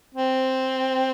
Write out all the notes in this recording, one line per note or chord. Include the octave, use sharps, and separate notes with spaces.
C4